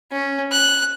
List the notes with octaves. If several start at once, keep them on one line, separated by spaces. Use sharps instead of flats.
C#4
F#6